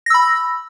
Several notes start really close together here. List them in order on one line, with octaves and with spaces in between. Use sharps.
A#6 E6 B5